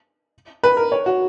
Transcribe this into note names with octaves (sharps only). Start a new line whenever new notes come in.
B4
A#4
C#5
F#4